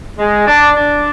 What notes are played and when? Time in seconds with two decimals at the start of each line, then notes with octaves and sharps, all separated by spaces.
0.19 G#3
0.48 D4
0.76 D4